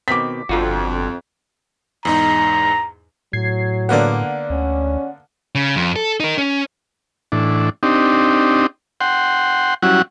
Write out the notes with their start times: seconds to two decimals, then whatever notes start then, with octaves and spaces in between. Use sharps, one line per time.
0.08 B2 D#3 C4 D6 B6
0.49 G1 F2 D3 F4 F#4
2.05 E2 G#2 D#4 A#5
3.33 A2 F#3 G#6 C7
3.89 D3 A#3 B3 D5 F#5
4.50 D2 C#4
5.55 C#3
5.76 F2
5.96 A4
6.20 D#4 A#4
6.38 C#4
7.32 A2 E3 D4
7.83 C4 D4 D#4 G4
9.01 F#5 G5 C6
9.83 F#3 G3 C#4 E4 F#4 F#5